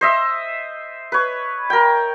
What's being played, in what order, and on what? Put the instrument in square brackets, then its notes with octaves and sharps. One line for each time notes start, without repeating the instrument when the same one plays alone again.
[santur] C5 D#5 E5
B4 C#5
A#4 G5